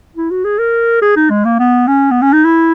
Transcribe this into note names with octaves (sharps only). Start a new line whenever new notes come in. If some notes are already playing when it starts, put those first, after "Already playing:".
E4
F#4
G#4
A#4
G#4
D#4
G#3
A#3
B3
C#4
B3
C#4
D#4
E4